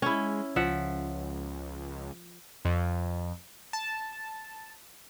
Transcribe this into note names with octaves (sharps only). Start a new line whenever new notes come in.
G#3 C#4 E4
C#2 F3 E5 F#5
F2
A5